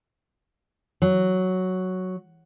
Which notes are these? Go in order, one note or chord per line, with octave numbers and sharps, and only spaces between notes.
F#3